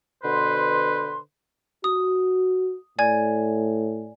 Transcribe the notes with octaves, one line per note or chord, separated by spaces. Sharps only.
B2 D3 B4 C5 C6
F#4 D#6
A2 D5 G#5 G#6